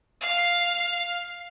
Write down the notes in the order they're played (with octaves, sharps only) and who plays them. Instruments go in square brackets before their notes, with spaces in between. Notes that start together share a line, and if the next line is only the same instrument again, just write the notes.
[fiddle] F5